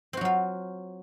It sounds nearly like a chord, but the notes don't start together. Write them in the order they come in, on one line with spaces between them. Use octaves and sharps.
C4 F#4 F#3 F4